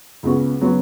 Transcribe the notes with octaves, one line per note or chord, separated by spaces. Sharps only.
C#2 C#3 G#3 B3 F#4
C#3 F#3 B3 F#4